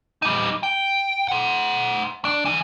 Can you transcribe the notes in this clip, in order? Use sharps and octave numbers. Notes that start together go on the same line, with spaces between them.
G3 D#4
G5
C5 F#5
D4
D3 E3